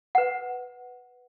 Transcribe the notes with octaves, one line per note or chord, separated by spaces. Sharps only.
B4 F#5